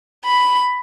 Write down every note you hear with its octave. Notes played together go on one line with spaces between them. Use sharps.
B5